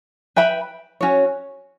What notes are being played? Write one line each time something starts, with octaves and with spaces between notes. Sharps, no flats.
B4 E5 G5 B5
C#4 F#4 C#5